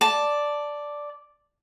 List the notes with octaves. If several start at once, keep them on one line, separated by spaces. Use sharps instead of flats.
D5 A5